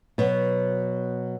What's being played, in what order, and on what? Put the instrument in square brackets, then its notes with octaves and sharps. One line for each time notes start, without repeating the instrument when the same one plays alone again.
[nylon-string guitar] B2 F#3 B3